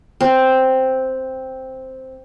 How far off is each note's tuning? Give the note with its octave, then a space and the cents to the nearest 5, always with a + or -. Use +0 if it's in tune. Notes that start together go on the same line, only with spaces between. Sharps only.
C4 +0